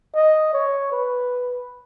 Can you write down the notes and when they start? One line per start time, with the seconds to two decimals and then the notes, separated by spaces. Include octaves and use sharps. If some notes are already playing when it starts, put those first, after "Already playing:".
0.15 D#5
0.54 C#5
0.92 B4